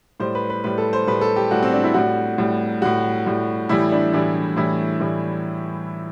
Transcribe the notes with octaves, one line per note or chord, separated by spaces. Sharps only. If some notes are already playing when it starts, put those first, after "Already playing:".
A2 G3 C5
B4
B4
A2 G3 B4
A4
C5
A2 G3 B4
A4
G4
A2 G3 F#4
C4
D4
E4
A2 G3 F#4
A2 G3
A2 G3 F#4
A2 G3
A2 E3 G3 E4
D4
A2 E3 G3 D4
A2 E3 G3 E4
A2 E3 G3